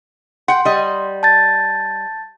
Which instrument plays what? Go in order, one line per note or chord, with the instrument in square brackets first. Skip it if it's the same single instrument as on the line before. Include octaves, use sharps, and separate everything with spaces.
[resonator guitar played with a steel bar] F#5 G5 [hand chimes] C6
[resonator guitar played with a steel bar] G3 D#5
[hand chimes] A5 G6 A6